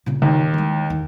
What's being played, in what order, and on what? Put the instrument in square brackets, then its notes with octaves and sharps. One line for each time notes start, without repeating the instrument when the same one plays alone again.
[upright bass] A#2 C#3
[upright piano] D#2
[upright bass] E3 G#3
D#2